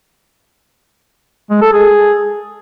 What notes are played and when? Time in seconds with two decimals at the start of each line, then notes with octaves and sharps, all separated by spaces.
1.50 G#3
1.62 A4
1.73 G#4